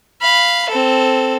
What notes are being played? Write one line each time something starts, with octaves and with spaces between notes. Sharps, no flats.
F5 B5
C4 A4